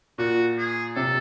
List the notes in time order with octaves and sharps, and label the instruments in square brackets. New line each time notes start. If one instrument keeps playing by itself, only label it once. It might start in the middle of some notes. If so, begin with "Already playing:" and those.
[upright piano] A#2 [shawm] F#4
[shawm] G#4
[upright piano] C3 [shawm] A4